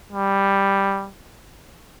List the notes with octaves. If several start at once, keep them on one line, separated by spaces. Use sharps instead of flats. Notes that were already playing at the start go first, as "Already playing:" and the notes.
G3